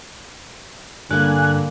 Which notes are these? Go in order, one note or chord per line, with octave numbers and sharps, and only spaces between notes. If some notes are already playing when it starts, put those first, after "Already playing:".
G2 D3 A#3 D5 G#5 F#6